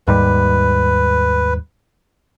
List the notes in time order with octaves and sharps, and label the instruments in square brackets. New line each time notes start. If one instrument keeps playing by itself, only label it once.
[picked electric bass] D#2 G#2 G3 [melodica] B4